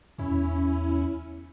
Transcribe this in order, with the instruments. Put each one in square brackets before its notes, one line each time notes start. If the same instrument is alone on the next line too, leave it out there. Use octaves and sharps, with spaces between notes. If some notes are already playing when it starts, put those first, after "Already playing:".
[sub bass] E2 [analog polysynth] C#4 E4